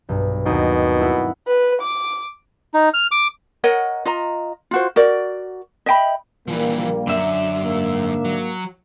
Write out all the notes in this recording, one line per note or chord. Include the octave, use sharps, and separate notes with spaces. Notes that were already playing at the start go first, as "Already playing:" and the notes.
B1 G2
D#2 B2 C4 D#4
E4 F#4
B4
D6
D#4
F6
D6
A#4 C#5 D#5 F#5
F4 D#5 A#5
F4 F#4 C5
F#4 A#4 D5
D#5 E5 G5 B5
A#1 E3 F3 G3 A#3
F#2 D3 E5
G#2 A#3
F#3